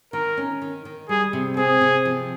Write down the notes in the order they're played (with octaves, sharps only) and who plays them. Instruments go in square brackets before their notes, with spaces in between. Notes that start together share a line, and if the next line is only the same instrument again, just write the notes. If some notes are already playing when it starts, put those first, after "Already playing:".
[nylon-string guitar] D#3 [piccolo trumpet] A#4
[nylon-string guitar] C#4
D#3
D#3
[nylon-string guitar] G3 [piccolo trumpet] G#4
[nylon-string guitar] C3
[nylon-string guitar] C4 [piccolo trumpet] G#4
[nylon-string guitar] C3
F3